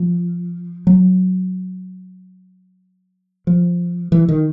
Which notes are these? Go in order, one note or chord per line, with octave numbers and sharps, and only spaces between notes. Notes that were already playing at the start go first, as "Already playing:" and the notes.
Already playing: F3
F#3
F3
E3
D#3